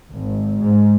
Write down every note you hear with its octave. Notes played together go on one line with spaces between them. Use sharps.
G#1
G#2